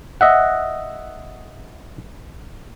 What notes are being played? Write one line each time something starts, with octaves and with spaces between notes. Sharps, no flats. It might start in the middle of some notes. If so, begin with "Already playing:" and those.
D#5 E5 F#5